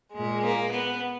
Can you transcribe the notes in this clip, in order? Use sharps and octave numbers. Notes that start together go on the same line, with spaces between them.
A#2 G#3
A#3
B3